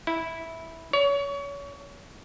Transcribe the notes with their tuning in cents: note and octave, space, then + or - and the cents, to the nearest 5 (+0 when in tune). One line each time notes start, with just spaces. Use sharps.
E4 -10
C#5 +30